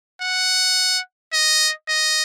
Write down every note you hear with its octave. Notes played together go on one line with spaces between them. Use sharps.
F#5
D#5
D#5